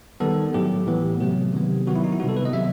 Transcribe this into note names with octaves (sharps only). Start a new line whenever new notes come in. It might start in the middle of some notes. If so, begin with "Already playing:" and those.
D#3 G3 B3 A4
A2 F#3 A3 G4
A2 E3 B3
C3 F#3 A3 G4
C3 D#3 F#3 B3
D#3 F#3 B3 F#4
E4
D#4
E4
C3 D#3 G3 B3 F#4
A4
B4
D#5
C3 F#3 B3 E5